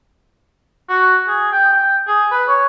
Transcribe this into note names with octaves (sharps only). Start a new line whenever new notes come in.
F#4
G#4
G5
G5
G#4
B4
C#5